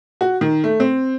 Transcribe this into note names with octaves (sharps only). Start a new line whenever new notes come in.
F#4
D#3
A3
C4